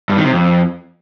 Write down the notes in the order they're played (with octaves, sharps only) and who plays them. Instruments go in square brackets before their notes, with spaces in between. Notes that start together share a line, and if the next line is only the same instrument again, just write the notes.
[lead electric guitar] G2
D#3
C3
F2